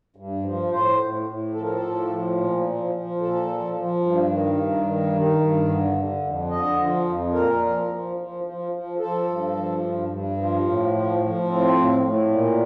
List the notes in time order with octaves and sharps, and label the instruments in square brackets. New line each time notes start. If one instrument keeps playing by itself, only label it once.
[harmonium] G2
F3
A2 C5
A2
A2
F3 A4
A#4
A4
A2
F3
A#2
F3
F3
A#2 A4
F3
F3
G2
D#3
G2
D#3
D#3
G2
D3
D3
F2
D3 D#5
F3
F2
A#2 A#4
F3
F3
F3
F3
F3
F3 A4
G2
F3
G2
G2
F3
A2
F3
F3
A2 C4
A2
A2
A#2